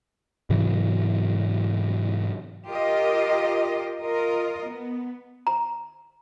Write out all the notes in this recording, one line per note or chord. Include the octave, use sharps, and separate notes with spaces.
G#2 C3 E3 F#3
F4 G4 A#4 D#5
F4 A#4 D#5
B3
A#5